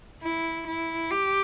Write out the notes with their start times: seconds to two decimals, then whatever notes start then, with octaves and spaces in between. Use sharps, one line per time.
0.23 E4
0.67 E4
1.11 G4